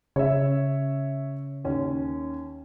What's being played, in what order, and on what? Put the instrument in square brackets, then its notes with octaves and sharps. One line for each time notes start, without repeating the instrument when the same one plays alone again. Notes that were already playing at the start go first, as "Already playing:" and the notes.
[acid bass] C#3 [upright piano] C#5 E5
[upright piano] D#2 C#4